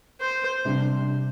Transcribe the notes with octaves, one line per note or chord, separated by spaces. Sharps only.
C5
C3 G3 D4 G4